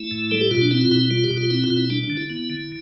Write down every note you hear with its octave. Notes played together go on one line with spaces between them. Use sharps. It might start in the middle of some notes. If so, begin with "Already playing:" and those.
Already playing: A3 E4
A2
G3 A4
G4
B2 F4
D4
C4 E4
F4
B2 E4
G3 F4
G4
B2
F4
C4 E4
F4
B2
E4
G3 D4
D4
D3
E4
B3
D3